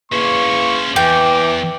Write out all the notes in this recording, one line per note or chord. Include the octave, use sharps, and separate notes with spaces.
E2 A#3 C#4 C5 C#6
E2 E3 G5 D6